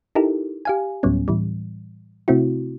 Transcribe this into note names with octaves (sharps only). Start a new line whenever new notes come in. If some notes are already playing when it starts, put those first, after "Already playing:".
D#4 E4 G4 A4 A#4
G4 F5 G#5
D2 A2 F#3 G3 B3 C#4
A2 E3 G3
C3 A3 C4 E4 F#4